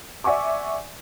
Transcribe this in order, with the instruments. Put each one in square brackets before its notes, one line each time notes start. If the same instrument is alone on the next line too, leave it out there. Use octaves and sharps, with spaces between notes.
[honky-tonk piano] D5 E5 F#5 G#5 C#6 D6